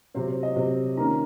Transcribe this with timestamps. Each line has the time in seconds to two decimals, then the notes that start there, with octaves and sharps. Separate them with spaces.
0.14 C3 F#3 C4 C5
0.29 C5
0.43 D#5
0.56 C3 F#3 C4
0.97 D#3 A#3 C#4 A#5